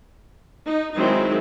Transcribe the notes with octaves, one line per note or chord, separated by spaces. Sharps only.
D#4
D#3 F#3 G#3 C4 D#4 E4